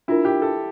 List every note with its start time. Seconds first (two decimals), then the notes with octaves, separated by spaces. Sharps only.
0.08 D4 E4 F4 A#4
0.25 G4
0.42 A4